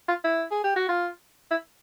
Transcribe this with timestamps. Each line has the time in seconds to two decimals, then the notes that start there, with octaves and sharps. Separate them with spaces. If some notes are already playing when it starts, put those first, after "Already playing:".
0.08 F4
0.24 E4
0.51 G#4
0.64 G4
0.76 F#4
0.89 F4
1.51 E4